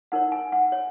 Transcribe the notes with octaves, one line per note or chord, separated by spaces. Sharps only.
D#4 A#4 C#5 F#5
G#5
F#5
C#5